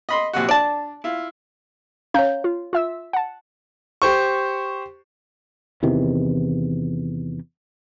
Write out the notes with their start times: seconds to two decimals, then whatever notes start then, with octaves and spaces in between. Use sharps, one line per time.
0.09 D#5 B5 C6
0.33 A#1 C3 F#4
0.49 D4 D5 A5
1.04 E4 F4
2.14 C#4 C#5 F5 A#5 G6
2.44 F4
2.73 F4 E5 E6
3.13 F#5 A5
4.02 G4 C5 C#6
5.83 E2 C3 D#3 E3